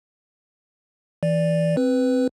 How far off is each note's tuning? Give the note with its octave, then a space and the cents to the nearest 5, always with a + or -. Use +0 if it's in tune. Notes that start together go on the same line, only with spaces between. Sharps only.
E3 +0 D5 +0
C4 +0 B4 +10